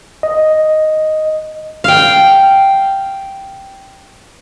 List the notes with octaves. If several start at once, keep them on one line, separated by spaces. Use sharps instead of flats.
D#5
F5 G5